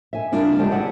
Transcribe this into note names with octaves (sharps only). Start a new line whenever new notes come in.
E5 G#5
C#3 G3 D4 E4 F4 A#4
C#3 G#3 G4 D5 A5
F#3 E4 G#4 D5 F#5